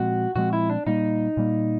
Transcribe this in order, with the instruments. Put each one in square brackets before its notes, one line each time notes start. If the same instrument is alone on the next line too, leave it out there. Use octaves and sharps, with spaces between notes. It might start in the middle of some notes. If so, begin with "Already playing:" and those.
Already playing: [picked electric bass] A#2 F3 G#3 C4 [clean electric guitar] F#4
[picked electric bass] A#2 F3 G#3 C4 [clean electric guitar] F#4
[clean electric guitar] E4
D4
[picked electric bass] A#2 G3 A#3 [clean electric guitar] D#4
[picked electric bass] A#2 G3 A#3